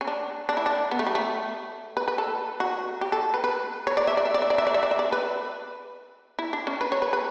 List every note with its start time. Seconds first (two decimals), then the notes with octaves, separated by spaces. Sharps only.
0.01 C#4
0.08 D4
0.49 D4
0.57 E4
0.66 D4
0.91 B3
0.99 A3
1.06 G3
1.15 A3
1.97 B4
2.08 B4
2.18 A4
2.60 F#4
3.01 G4
3.12 A4
3.34 B4
3.44 B4
3.87 C#5
3.97 D5
4.07 E5
4.17 D5
4.25 E5
4.34 D5
4.42 E5
4.50 D5
4.58 E5
4.67 D5
4.74 E5
4.83 D5
4.91 E5
4.99 D5
5.12 B4
6.39 E4
6.53 D4
6.67 C#4
6.81 B4
6.92 C#5
7.02 B4
7.13 B4